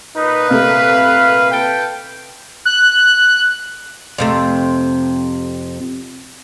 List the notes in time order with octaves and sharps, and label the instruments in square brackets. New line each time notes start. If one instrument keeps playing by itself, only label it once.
[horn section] A#2 B4 [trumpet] D#4
[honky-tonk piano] C3 A3 [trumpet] F5
[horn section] A4 B4 G5
[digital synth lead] F#6
[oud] F2 C3 A3